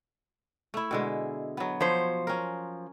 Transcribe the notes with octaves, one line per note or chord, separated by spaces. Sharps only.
A3 E4
B2 D3 G#3
F#3 B3
F3 C5 C#5
C#4 A#4